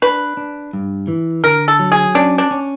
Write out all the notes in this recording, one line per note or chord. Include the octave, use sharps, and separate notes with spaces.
D4 B4
D4
G2
E3
D3 A#4
A4
F#3
G#4
C#4 D4
D4
C#4